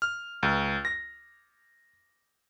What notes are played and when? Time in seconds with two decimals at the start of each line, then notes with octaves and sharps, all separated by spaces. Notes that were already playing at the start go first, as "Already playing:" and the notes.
0.02 F6
0.43 C#2
0.85 A#6